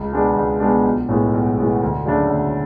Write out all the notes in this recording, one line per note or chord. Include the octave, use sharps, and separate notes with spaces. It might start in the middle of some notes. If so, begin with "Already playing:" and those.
Already playing: C#2
B2 G#3 B3 D4
C#2
B2 G#3 B3 D4
B1
A2 G#3 B3 F#4
B1
A2 G#3 B3 F#4
D2
C#3 F#3 A3 D4
D2